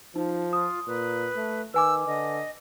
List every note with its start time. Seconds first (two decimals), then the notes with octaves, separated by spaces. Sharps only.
0.16 F3 D#4
0.53 F4 D#6
0.87 A#2 B4
1.36 A3
1.74 D#3 B4 G#5 D6 E6
2.07 D3 D#5